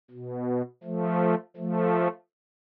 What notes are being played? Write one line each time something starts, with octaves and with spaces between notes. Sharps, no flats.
B2
F3 A3
F3 A3